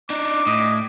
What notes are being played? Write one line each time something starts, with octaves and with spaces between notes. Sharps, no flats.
D4 D#4 D6
A2 D#5